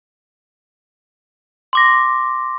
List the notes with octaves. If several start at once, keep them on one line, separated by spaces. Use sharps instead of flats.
C6 D6 A#6